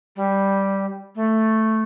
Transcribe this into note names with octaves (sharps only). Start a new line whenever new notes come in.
G3
A3